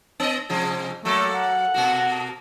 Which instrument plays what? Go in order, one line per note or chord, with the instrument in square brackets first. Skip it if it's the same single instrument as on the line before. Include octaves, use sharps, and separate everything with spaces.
[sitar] B3 D#5
C3 F3 G#3
[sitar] F#3 A#3 A4 [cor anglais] A3
[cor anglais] F#5
[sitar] B2 A#3 F#4